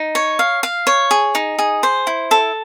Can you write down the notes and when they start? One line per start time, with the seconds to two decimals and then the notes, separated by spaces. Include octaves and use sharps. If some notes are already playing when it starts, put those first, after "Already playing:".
Already playing: D#4
0.15 C#5
0.39 F5
0.63 F5
0.87 C#5
1.11 G#4
1.35 D#4
1.59 G#4
1.83 C5
2.07 E4
2.31 A4